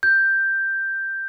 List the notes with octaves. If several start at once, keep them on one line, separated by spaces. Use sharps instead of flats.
G6